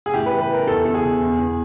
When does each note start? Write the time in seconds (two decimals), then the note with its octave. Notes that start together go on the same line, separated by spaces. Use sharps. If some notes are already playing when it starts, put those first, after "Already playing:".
0.06 G#4
0.14 A2 G4
0.26 B4
0.31 E3
0.41 B4
0.49 E3 A#4
0.67 E2 A4
0.85 E2 A4
0.94 G#4
1.03 B2
1.21 E2
1.39 E2